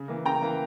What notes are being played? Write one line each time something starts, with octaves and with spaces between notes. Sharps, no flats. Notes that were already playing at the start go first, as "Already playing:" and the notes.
Already playing: C#3
E3 A#3
C#3 G5 A#5
E3 A#3